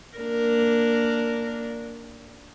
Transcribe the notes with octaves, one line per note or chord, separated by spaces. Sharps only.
A#3 D4 A#4